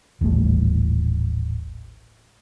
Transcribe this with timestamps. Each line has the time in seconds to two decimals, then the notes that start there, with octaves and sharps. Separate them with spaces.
0.21 D#1 A1 A2 G3